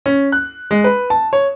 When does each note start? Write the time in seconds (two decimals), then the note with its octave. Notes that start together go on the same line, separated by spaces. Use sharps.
0.06 C#4
0.32 F#6
0.71 G#3
0.84 B4
1.10 A5
1.33 C#5